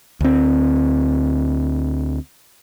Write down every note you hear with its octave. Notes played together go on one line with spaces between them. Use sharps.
D2 C4